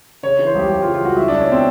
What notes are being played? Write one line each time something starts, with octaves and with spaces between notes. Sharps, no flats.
C#3 C#5
E3
C5
C#2 G4
C#2 G4
F4
C#3
F4
C#2 F#4
C#2 E4
C#2 D4
C#4
B2 C4